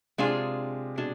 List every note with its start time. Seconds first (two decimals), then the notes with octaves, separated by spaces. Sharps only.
0.18 C3 G#3 D4 F4 G#4
0.98 B2 G#3 D4